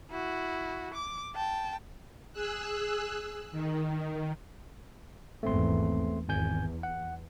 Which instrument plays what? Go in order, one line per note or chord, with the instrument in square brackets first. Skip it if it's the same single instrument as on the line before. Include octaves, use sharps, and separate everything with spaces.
[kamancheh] E4 F#4
D6
G5 A5
[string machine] G#4 E6 F#6
D#3
[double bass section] G#1 E2 [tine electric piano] A3 C4 C6
[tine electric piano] G#1 G#5 G6 [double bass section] E2
[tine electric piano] F#5